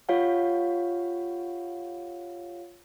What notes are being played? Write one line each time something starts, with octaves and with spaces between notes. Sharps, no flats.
F4 G4 C#5 F5 F#5